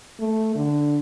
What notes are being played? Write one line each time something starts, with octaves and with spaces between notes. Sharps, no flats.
A3
D3